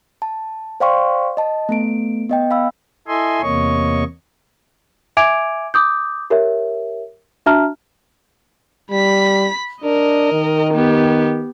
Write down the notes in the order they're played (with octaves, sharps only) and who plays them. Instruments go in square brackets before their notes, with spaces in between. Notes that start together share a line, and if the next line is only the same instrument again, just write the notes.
[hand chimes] A5
C5 D5 F5 G5 C6 C#6
D#5 A5
A3 B3 D7
B3 D#5 G5
F5 B5 E6
[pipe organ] E4 A4 D#5 E5 G#5 C6
E2 C3 A#3 C#5 D#5 C#6
[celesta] E5 G#5 D6 G#6 D7 F7
D6 D#6 G6
G4 A#4 C#5 E5
D4 F#4 E5 A5 A#5 F6
[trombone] G3 [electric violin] B5 B6
[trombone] D4 [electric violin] A#4 D#5
[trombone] D#3
[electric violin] B3 G4